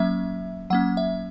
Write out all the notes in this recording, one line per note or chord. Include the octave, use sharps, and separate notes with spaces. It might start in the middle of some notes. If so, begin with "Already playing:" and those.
Already playing: F#3 A#3 C#4 E5
F#3 A#3 C#4 F#5
E5